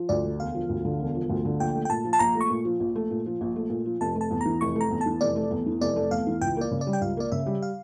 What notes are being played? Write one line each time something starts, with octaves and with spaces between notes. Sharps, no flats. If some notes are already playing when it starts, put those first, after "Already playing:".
Already playing: F3
D2 D5
D3
E1 F5
F3
D2
D3
E1
F3
D2
D3
A#1 G5
A3
G5
A#2 A5
F3
A5
A#1 A#5
A3
C#6
A#2
F3
A#1
A3
A#2
F3
A#1
A3
A#2
F3
F1 A5
A3
A5
E2
E3 A#5
F1 C#6
A3
A#5
E2
A5
E3
F1 D5
A3
E2
E3
F1 D5
A3
E2 F5
E3
C#2 G5
A#3 D5
C#3
D5
G3
G5
C#2 F5
A#3 D5
C#3 E5
G3
F5